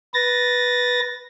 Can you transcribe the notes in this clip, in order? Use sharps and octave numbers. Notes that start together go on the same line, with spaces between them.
B4 A6 A#6